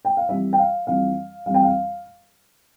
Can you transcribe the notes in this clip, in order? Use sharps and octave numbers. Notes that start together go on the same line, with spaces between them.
G5
F5
F2 E3 G3 E5
G5
F5
F2 E3 G3 F5
F2 E3 G3 F5
G5
F5